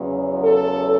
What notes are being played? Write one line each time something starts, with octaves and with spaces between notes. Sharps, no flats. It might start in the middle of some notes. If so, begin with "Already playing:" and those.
Already playing: E2 C#3 F#3
A4